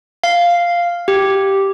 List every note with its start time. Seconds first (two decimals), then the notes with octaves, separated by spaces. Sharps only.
0.24 F5
1.08 G4